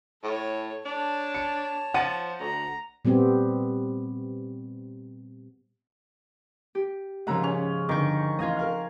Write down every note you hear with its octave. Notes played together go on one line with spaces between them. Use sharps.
A2 A4 C#5
D4 C#5 A5
C#7
F3 F#5 A6 D#7
D2 A#5
A#2 G3 B3 C4 G4
G4
G#2 C#3 F3 A#3 F#5 A#5 E6
C#4 F7
G1 D#3 C#6 D6 G6
A1 F4 D#5 F5 G#6
A#4 F5 F6